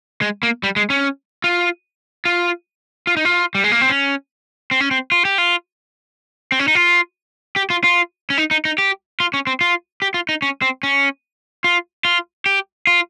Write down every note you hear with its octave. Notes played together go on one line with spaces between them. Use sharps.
G#3
A#3
G3
G#3
C#4
F4
F4
F4
D#4
F4
G3
G#3
A#3
C4
C#4
C4
C#4
C4
F4
G4
F4
C4
C#4
D#4
F4
G4
F4
F4
C#4
D#4
D#4
D#4
G4
F4
C#4
C4
F4
G4
F4
D#4
C#4
C4
C#4
F4
F4
G4
F4